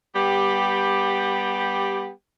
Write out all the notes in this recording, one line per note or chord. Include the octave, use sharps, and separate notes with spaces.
G3 B3 G4